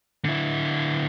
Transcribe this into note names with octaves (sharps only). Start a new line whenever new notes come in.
D3 E4